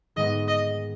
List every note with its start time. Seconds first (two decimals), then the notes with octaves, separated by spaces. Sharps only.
0.16 G#2 D#3 G#3 B3 D#5
0.48 D#5